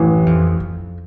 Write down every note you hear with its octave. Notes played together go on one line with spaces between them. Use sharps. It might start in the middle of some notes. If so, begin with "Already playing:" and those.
Already playing: A1 F#2 A2 E3
F2
F2